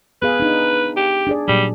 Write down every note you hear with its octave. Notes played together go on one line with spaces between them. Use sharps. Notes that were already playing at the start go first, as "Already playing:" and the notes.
B3 G#4 B4 F5
D4 D#4
G4
D4 G#4 D5
A#2 F#3 G3